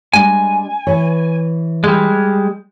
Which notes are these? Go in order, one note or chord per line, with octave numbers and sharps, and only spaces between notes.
G3 G#3 D4 G#5
E3 B4 C#5
G3 G#3